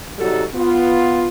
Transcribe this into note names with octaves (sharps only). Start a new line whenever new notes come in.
C3 F#3 G3 D#4 F#4 A4
B3 F4